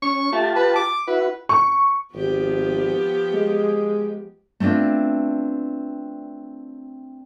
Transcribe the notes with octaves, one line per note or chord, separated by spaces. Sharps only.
C#4 C#6
A3 F4 G4 A5
B4
D6
E4 F#4 B4
C#6
G#1 F3 B3 G4
G#3
A3 B3 C4 D4 F4